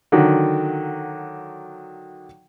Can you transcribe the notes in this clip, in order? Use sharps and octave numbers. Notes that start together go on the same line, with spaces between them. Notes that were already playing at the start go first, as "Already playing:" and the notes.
D3 D#3 F#3